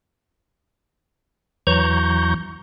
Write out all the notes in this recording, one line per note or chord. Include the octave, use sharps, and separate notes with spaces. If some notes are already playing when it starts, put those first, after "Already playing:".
E2 E3 F#3 A#5 C#6 G6